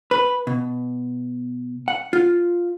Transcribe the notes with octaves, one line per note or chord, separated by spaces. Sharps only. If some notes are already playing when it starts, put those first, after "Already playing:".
B4
B2
F#5
F4